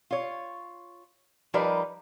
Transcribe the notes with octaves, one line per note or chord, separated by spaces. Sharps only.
F4 C#5
F3 G3 D#4 A#4 B4 D5